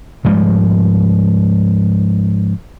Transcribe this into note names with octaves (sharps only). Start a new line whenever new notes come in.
G#2 F3 G3 G#3